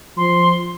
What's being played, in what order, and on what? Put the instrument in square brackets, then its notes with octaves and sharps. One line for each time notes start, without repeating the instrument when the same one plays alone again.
[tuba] F3 [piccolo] C6